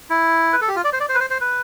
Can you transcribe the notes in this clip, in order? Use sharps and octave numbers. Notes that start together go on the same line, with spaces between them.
E4
B4
A4
G4
F4
D5
C5
D5
C5
B4
C5
C5
B4